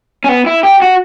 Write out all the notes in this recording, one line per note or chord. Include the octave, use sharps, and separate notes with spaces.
C#4
B3
E4
G4
F#4